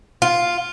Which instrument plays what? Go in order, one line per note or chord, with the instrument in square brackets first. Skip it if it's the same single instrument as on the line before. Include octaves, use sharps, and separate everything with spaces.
[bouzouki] F4